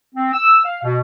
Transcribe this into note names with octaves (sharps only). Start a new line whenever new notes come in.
C4
E6
F5
B2